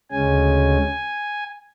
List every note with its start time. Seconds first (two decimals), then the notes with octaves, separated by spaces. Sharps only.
0.11 D2 C#3 G#3 C#4 G#5